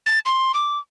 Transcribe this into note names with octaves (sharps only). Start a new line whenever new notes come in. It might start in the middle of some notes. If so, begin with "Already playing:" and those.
A6
C6
D6